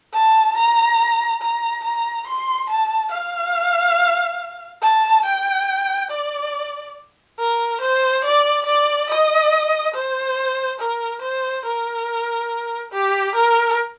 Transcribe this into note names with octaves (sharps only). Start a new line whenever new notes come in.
A5
A#5
A#5
A#5
C6
A5
F5
A5
G5
D5
A#4
C5
D5
D5
D#5
C5
A#4
C5
A#4
G4
A#4